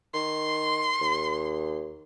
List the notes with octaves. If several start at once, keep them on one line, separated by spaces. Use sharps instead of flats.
D#3 C6
D#2